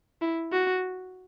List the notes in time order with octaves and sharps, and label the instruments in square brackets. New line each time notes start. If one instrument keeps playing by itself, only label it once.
[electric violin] E4
F#4